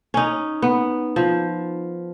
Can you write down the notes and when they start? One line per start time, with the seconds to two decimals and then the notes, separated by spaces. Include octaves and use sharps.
0.14 C#4 D#4
0.62 B3
1.16 F3